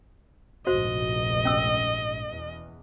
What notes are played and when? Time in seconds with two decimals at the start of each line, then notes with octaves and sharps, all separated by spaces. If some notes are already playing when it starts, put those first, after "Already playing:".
0.67 F1 A#1 G#2 F#4 C5 D#5
1.45 C#4 E6
2.28 E2 B2